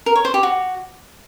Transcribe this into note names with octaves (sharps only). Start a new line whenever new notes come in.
A#4
C#5
C5
G4
F#4